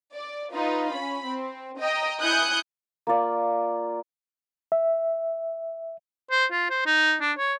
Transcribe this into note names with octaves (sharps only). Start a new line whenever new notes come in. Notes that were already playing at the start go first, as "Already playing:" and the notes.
D5
D#4 F4 B4
C#4 B5
C4
D#5 G5 A#5
E4 G#5 D#6 F#6 G6 C#7
A#3 F4 D5
E5
C5
F4
C5
D#4
D4
C#5